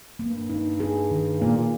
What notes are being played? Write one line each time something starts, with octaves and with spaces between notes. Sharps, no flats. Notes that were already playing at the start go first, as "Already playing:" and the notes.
G2 A#3
D#4
G#4
D#3
A#2 A#3
A#2